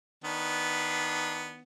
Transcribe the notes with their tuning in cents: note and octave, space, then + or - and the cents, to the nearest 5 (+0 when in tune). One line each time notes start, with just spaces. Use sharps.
D#3 +15 B3 +0 D4 +0